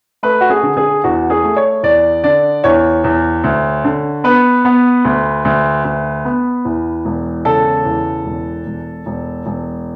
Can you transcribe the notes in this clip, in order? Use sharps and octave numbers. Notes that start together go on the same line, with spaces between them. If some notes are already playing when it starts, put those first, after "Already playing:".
A3 B4
F#4
G#4
D3
G#4
E2 F#4
G#4
A3
C#5
E2 D5
D3 D5
E2 C#5
E2
D2
D3
B3 B4
B3
D2
D2
D2
B3
E2
E1
C#3 A4
E2
E1
E1
E1
E1